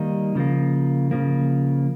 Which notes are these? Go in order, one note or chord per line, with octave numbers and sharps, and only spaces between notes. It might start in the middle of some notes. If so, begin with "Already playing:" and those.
Already playing: D#3 G3 A#3 D#4
C#3 F3 A#3
C#3 F3 A#3